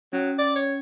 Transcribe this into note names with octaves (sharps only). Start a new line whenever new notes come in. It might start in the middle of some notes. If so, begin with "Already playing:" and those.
F#3 C#4
D5
C#5